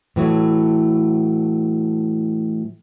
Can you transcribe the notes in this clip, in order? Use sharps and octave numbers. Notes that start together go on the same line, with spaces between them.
A2 E3 F#3 A3